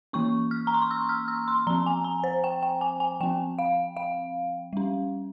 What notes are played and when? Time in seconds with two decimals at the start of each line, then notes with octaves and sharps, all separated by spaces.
0.13 E3 A#3 C#4 C#6
0.51 F6
0.67 A#5
0.74 C6
0.82 C#6
0.91 E6
1.09 F6
1.28 E6
1.48 C6
1.67 F3 C4 A#5
1.86 G#5
2.04 A#5
2.24 C5
2.44 G5
2.63 G5
2.81 G#5
3.00 G#5
3.21 F3 C4 G5
3.59 F5
3.97 F5
4.73 G3 C#4